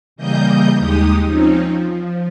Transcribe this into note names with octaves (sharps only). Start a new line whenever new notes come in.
C#3 E3 G3 A#3 D#5 G6
D#2 G#3 D#4 G4 D#6
F3 C4 C#4 D#4
F3